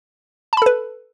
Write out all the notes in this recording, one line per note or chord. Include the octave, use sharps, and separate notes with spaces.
A4 B4 A5 B5